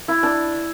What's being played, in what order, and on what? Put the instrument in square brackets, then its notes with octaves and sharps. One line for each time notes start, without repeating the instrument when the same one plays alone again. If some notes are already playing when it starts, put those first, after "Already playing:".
[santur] E4
D4